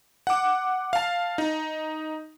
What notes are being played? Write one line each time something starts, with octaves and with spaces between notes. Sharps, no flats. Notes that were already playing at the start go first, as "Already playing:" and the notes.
F#5 D6
F5 A5
D#4